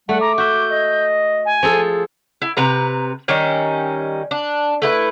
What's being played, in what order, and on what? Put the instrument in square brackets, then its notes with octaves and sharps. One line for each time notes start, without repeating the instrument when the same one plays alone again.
[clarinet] G3 [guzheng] A3 [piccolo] F#5
[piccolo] A#5 [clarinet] D6
[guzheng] F#4 E5 [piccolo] G6
[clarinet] D#5
[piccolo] G#5
[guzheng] F3 G#4 A4
[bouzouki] E4
C3 B4 A#5
D#3 G3 C#4 D#4
D4
A3 E4 B4